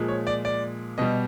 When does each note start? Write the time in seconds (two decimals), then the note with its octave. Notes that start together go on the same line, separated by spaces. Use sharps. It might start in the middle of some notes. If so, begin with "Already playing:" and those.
Already playing: A#2 F3 G#3
0.08 C#5
0.27 D5
0.45 D5
0.98 B2 G3 D#5